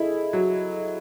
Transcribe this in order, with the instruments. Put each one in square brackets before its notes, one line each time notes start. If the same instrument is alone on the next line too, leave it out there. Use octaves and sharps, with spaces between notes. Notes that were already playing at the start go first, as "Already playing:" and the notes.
Already playing: [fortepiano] E4 [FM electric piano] G#4 A4 D#5
[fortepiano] F#3